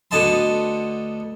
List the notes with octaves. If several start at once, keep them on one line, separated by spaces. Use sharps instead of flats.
D2 D3 B3 D#5 A5 C6